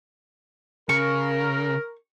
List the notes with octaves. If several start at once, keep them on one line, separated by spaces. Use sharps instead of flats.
C#3 A#4 C#6